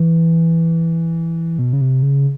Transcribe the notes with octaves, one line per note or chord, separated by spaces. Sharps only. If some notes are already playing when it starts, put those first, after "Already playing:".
Already playing: E3
B2
C#3
C3
C#3